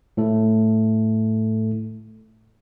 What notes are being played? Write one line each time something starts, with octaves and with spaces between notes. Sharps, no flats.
A2 A3 A4